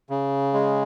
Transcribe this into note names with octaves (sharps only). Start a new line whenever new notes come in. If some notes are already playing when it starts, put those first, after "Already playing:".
C#3
G#3